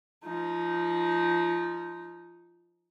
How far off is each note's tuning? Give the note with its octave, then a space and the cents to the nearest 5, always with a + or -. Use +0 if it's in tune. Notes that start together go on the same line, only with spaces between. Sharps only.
F3 -15 D#4 +0